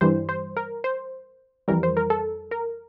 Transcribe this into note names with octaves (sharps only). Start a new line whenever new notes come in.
G2 E3 G3 C5
C5
A#4
C5
F2 E3 G3 A#4
C5
A#4
A4
A#4